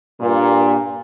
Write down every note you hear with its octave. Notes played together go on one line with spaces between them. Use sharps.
G2 A#2